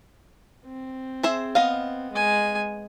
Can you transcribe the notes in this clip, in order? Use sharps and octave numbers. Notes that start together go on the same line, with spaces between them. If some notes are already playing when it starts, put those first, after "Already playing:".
C4
G#4 C5 E5
B3 D#5 F5
G#3 G#5